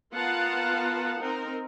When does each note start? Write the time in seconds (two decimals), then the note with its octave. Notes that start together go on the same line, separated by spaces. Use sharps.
0.14 B3 F4 A#4 F5 F#5 A5
1.21 C4 D#4 A#4